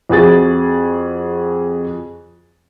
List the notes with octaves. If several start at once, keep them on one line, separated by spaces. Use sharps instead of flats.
F2 F#4 G#4 A6